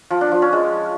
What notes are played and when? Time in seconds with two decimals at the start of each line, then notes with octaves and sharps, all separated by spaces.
0.11 F3
0.21 D4
0.32 F3
0.42 C#4
0.53 G#3